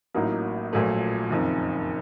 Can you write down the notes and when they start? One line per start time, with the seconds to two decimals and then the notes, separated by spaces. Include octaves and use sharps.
0.15 A1 A2 F#3 A#3 D#4
0.73 A#1 A#2 F#3 A3
1.30 F#1 F2 D#3